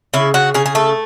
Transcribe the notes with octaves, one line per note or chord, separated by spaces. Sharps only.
C#3 E4
C#3 F#4
C#3 G#4
G#4
A3 A4